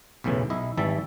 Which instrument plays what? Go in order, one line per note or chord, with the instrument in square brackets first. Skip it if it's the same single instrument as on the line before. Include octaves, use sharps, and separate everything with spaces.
[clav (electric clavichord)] B1 E2 A2 C#3 E3
B1 E4 D#5
G#1 E3 G3 E5 A5